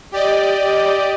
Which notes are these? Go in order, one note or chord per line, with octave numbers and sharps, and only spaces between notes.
G4 D5 D#5